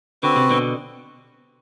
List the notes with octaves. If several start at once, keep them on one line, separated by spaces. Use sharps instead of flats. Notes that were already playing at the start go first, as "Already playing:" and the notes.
D3 C4 F#4 B4
C3
B2 D3